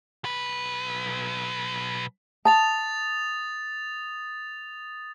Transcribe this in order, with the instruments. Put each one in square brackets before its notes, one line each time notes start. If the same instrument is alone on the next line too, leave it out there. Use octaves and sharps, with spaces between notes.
[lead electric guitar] B1 B4
[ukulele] A5 [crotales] D#6 A6 F7